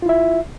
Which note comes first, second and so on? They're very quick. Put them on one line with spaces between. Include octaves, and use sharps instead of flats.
F4 E4 E5